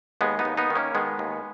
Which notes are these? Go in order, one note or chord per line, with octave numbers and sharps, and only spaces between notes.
D#2 G#3 B3
B3 D#4
D#2
B3 D#4
D#3
A#3 C#4
D#3 G#3 B3
D#2